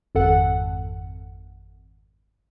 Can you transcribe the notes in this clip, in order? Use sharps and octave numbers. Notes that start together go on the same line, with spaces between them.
G#1 F2 A4 F#5